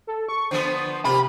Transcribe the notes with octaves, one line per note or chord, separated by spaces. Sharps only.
A4
C#6
D3 F3 B3 C5
C3 A#3 F4 G4 B5